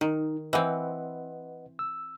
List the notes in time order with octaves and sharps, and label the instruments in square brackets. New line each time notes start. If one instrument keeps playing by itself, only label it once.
[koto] D#3 [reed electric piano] D#4
[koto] E3 C4 [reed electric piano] B4 D#5 F#5
[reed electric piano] E6